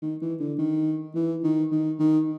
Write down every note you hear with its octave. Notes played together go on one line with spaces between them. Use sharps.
D#3
E3
D3
D#3
E3
D#3
D#3
D#3